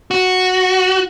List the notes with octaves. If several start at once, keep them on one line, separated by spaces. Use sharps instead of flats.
F#4